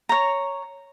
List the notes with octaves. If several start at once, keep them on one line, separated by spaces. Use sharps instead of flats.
C#5 A#5